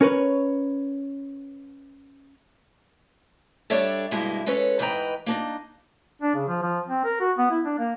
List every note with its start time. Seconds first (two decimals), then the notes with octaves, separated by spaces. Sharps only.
0.01 C#4 A#4 B4 C#5
3.70 G3 D4 A4 C#5 D5 E5
4.11 G2 B2 G#3 A#3 E4
4.46 G#3 C#4 A4 B4 C#5
4.79 G#2 E3 B4 D#5 G5 A#5
5.26 A#3 D4 D#4
6.22 D4
6.35 C#3
6.48 F3
6.62 F3
6.88 C4
7.04 A#4
7.20 F#4
7.38 B3
7.51 E4
7.65 D4
7.78 A#3